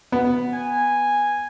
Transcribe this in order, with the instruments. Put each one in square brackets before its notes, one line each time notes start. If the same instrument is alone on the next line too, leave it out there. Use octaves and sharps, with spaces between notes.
[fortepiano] B3
[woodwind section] G#5